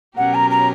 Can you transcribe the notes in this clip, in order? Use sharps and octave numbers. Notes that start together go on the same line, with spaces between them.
B2 F#3 C#4 G4 A#4 F#5
A#5
A#5